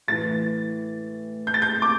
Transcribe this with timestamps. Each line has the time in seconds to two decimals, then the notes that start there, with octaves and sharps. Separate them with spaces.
0.08 A2 E3 A6
1.47 G6
1.54 A6
1.62 G6
1.82 D6